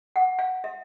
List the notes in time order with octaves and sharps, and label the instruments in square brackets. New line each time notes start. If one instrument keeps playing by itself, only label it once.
[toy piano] F#5
F5
E5